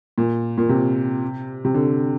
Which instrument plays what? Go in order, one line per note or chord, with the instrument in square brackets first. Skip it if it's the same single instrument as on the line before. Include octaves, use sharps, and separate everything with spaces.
[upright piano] A#2
A#2
C3
C3
D3